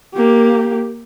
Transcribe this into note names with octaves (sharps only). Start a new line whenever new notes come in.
A#3 G4